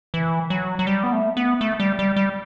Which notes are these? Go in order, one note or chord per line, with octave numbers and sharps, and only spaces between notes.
E3
F#3
F#3
G3
B3
A3
B3
A3
G3
G3
G3